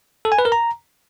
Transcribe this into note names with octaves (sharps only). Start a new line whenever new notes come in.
A4
G#5
B4
A#4
A#5